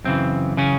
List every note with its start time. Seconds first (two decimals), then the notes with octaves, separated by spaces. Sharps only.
0.04 F#2 C#3 E3 C4
0.57 C#3 C#4